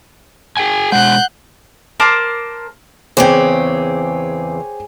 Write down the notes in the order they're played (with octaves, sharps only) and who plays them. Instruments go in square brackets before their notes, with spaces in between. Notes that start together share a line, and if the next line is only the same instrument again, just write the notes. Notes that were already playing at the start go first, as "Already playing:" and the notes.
[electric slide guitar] G#4 G5 G#5
[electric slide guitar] B2 G#3 [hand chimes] F#5 [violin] F#6 G6
[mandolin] A#4 C5 A5 D6
[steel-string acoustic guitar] E2 C#3 C4 [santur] G#4 C#5 D6 [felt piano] C5 G5